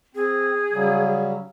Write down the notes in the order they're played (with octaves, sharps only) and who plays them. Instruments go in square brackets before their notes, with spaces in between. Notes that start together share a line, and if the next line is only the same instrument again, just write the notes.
[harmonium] C4 [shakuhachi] G#4
[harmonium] C#3 F#3 G3